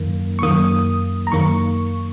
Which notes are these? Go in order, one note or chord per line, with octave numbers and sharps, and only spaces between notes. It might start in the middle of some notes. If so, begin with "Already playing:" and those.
Already playing: F#2 D#3 A#3
C#6
F#2 D#3 A#3 D#6
A#5
F#2 D#3 A#3 C#6